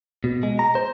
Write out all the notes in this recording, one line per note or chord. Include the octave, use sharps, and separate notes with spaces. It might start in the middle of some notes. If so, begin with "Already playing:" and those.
B2
G#3
A#5
C5